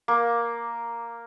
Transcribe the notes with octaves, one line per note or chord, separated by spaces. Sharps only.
A#3